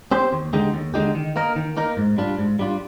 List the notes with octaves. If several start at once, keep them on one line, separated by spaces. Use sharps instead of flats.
C4 G4 C5
D#2
D3 G#3 D#4 G4
D#2
D3 G#3 D#4 G4
D#3
A#3 D#4 A#4
D#3
A#3 D#4 A#4
G#2
G3 D4 F4
G#2
G3 D4 F4